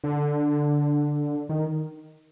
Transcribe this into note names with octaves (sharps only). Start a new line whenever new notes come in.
D3
D#3